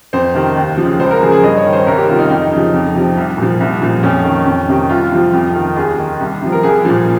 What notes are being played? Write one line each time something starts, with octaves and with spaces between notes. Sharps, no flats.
F2 C5
C3 D#3
D#2
F3
C#3
C#2 C5
A#4
C#3 F3 G#4
G#4
G2 D#5
C#5
D#3
C5
C2 A#4
G4
C3 D#3 F4
D#4
F2 D#4
C#3 F3
F2
C3 F3
C2
A#2 F3
C2
A#2 F3
F2 C#4
D#3
F2
C3 D#3
C2 F4
C3 F3
F2
D#3
D#2 G#4
D#3
C2
C3 F3
A#4
C2 G#4
A#2 F3